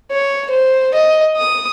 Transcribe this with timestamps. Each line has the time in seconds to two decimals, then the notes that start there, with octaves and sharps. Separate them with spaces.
0.11 C#5
0.50 C5
0.94 D#5
1.37 D#6